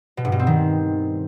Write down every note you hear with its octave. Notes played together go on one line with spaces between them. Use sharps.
B2
G2
B2
C4
D#3